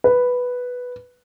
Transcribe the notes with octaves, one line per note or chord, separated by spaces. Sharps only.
B4